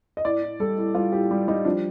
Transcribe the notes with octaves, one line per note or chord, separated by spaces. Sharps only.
D#5
A2 D5
A2
G3 A4
A2
G3 F4
A2 G4
G3
G3 D#4
F3 D4